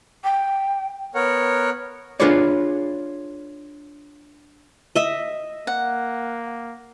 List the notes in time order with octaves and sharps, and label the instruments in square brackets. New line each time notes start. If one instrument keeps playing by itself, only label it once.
[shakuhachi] G5
[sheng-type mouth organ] B3 A#4 C#5 F#5
[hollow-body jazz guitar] D4 F4 G#4 B4 C#5 D5
[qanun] D#5 E5
[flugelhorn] A#3 [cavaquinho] F#5